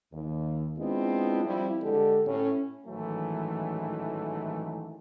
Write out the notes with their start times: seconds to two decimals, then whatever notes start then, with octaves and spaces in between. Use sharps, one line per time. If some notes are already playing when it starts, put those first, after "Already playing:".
0.13 D#2
0.79 G#3 B3 C4 D4 E4 F4
1.45 F3 G3 C4 E4
1.83 D3 G#3 G4 A4
2.25 A2 C#4
2.87 A1 G#2 D#3 E3 F#3 A3